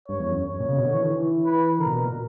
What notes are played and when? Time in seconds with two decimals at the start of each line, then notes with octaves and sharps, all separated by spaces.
0.08 G2 C#5
0.19 E2
0.31 F#2
0.43 C#5
0.60 A#2
0.69 C#3
0.76 B2
0.85 D3
0.94 E3
1.03 D3
1.11 E3
1.45 B4
1.79 D3 A#4
1.86 A#2
1.90 B2
2.03 A#2